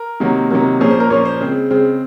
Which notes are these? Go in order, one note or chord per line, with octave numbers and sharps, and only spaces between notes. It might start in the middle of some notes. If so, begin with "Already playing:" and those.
Already playing: A#4
C3 D#3 F#3 A#3
C3 D#3 F#3 A#3
A#2 F3 A#3 C#4 G#4
C5
A#4
A#2 F3 A#3 C#4 C#5
C5
C#3 G#3 C4
C#3 G#3 C4